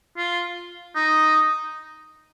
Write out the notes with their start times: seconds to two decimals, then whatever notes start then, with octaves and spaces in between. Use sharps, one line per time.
0.17 F4
0.96 D#4